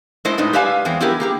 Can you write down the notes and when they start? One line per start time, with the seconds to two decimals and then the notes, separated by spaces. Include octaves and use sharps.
0.25 G#3 A3 E4 C5 D#5
0.38 A2 G#3 D#4 B4 D5
0.53 G4 B4 D5 E5 F5 G#5
0.85 E2 G#3 C4
1.00 B3 E4 G4 G#4 A#4
1.20 A#3 G4 G#4